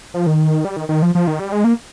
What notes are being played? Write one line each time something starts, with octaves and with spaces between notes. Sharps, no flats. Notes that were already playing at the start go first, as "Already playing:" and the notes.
F3
D#3
G3
D#3
D#3
F3
F3
D#3
G3
G#3
A#3